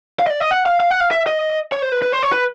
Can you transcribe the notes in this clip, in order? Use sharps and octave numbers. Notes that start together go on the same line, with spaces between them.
F5
D#5
D5
D#5
F#5
F5
F5
F#5
F5
E5
D#5
C#5
C5
B4
B4
C5
C#5
B4